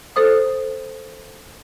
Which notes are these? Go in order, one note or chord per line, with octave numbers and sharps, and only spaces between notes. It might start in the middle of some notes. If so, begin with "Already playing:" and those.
A4 C5 D#6